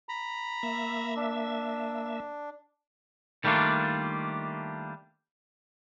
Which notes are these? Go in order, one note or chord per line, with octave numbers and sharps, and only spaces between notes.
A#5 B5
A#3 E5
D4
D#3 G3 A3 A#3 D4 F4